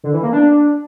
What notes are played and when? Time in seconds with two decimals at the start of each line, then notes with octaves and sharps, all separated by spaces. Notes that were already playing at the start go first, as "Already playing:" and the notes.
0.04 D3
0.13 E3
0.23 A#3
0.33 D4